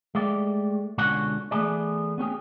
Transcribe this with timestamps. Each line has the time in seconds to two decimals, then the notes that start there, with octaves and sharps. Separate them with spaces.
0.15 G#3 A3 G4 D5
0.98 C#2 B2 D3 C#4 F#4 F#5
1.51 E3 A3 B3 G#4 D5
2.18 B3 C#4 G4 G#4